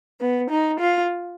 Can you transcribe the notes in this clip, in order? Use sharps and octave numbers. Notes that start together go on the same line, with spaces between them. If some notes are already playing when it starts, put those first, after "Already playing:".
B3
D#4
F4